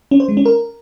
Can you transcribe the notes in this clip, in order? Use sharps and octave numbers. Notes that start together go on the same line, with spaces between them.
C#4
C5
G#3
C#4
A#4